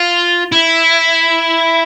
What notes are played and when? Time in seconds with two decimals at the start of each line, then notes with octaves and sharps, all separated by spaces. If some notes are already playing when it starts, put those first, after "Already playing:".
Already playing: F4
0.52 E4